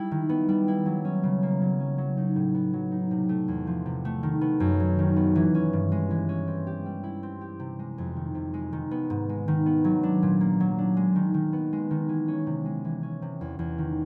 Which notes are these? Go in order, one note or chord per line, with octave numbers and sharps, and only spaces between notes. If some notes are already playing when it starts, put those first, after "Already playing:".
Already playing: G3 E4
D#3
B3
G3
E4
F#3
C#4
C#3
A#3
F#3
C#4
F#3
D#4
A2
B3
F#3
D#4
C3
A3
E2
F3
C3
A3
D#3
B3
F#2
F#3
D#3
B3
E3
C#4
G2
G#3
E3
C#4
C4
G4
G3
E4
C4
G4
C3
G#3
F2
D#3
C3
G#3
D#3
B3
G#2
G#3
D#3
B3
F#3
D4
A#2
A#3
F#3
D4
G#3
D#3
D#3
B3
G#3
D#3
E3
C#4
C3
G#3
E3
C#4
C3
E2
E2
D#3